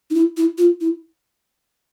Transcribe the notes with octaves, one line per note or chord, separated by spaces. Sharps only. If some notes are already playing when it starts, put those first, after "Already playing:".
D#4
E4
E4
F4
E4